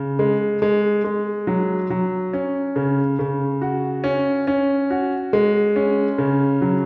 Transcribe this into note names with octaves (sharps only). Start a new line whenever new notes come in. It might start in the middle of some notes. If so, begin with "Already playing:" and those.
Already playing: C#3
G#3
G#3
G#3
F#3
F#3
C#4
C#3
C#3
F#4
C#4
C#4
F#4
G#3
C#4
C#3
F#3